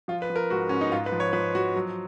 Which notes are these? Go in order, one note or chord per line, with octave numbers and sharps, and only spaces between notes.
F3 F4
B4
F3
A#4
G#2 F#4
G#2 C#4
D#4
G#2 F4
B4
F3
C#5
F3 B4
F3 F#4
F#3